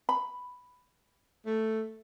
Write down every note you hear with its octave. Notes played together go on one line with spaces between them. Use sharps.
B5
A3